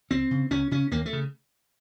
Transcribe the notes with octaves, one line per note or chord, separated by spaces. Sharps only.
C#2 C4
C#3
C#2 C#4
C#3 C#4
D#2 A#3
A3
C#3